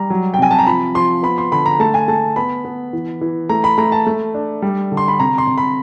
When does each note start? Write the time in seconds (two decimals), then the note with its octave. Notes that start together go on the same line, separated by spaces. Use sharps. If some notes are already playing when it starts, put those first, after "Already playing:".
Already playing: G3 A#5
0.10 F#3
0.34 G5
0.39 C3 G#5
0.51 A5
0.59 A#5
0.67 F3 B5
0.95 F3 C6
1.23 B3 B5
1.38 C6
1.52 D3 B5
1.66 A#5
1.80 A3 A5
1.94 G#5
2.08 A3 A5
2.36 B3 B5
2.65 B3
2.93 E3
3.21 E3
3.49 A3 A#5
3.64 B5
3.78 A3 A#5
3.92 A5
4.07 A3
4.34 D4
4.62 G3
4.92 D3
4.97 C6
5.08 B5
5.19 C3 A#5
5.38 C6
5.47 C3
5.58 B5